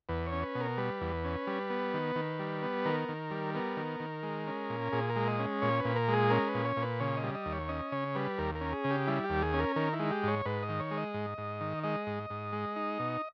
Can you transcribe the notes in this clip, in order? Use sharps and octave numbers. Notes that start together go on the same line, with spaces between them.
E2 B4
C#5
C#4
B4
B2
A#4
G3 B4
E2
C#4
G3
B3
D#3
D#3
G3
B3
D#3 A#4
D#3
G3
B3 A#4
D#3
D#3
G#3
C#4
A#2
A#2 G#4
A#4
G#3
D#5
C#4
A#2 C#5
B4
A#2
A#4
G#3
G#4
C#4 A#4
B4
A#2
C#5
A#2
B4
C#3 C#5
D#5
G3
D#5
D#2
C#5
C#4 D#5
C#3 C#5
G3 B4
D#2 A#4
A#4
C#4
G#4
C#3
G4
G3 E4
G4
D#2
G#4
C#4
A#4
D#3 A#4
E4
G#3
G4
G#2 C#5
G#2 B4
D#5
D#3
C#5
G#3
D#5
G#2
G#2
D#3
G#3 D#5
G#2
G#2
G#3
D#4
B2